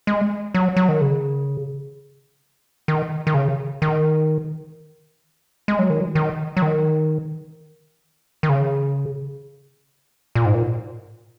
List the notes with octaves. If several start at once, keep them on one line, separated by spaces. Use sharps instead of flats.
G#3
F#3
F#3
D#3
C#3
D#3
D#3
C#3
D#3
G#3
F#3
D#3
F#3
D#3
F#3
D#3
D#3
C#3
A#2
G#2
A#2